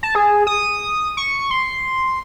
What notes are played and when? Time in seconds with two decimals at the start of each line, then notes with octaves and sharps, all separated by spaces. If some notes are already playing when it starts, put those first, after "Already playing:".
0.03 A5
0.15 G#4
0.47 D#6
1.17 C#6
1.51 C6